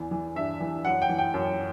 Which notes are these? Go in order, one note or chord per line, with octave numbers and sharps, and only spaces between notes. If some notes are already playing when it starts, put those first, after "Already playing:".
Already playing: E2 E3
E3
G2 E5
E3
F#2 F#5
G5
E3
G5
F#2